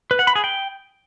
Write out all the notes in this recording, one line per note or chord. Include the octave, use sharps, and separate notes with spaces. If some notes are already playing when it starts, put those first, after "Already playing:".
B4
F#5
B5
G#4
G5